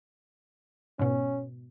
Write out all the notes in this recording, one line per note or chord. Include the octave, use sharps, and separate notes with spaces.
G#2 B2 C#4